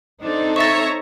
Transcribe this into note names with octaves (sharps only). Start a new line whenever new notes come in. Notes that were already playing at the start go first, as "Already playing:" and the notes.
C4 D4 D#4 A4
C#5 E5 A#5 C#6 A6